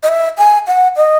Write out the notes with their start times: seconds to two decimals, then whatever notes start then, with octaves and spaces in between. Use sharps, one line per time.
0.03 D#5
0.08 E5
0.38 G#5
0.67 F#5
0.96 D#5